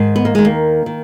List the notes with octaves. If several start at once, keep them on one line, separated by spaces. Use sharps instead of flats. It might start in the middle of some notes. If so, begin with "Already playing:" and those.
Already playing: G#2 D#3
B3
A#3
D#2 D#3 G#3
A#3
D#3